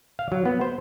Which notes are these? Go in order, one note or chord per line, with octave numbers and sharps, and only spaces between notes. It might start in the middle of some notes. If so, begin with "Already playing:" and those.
F5
F#3
B3
C5